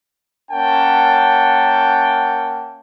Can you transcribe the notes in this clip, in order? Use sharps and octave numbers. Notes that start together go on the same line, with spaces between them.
A#3 C#4 A#4 F#5 G5 A5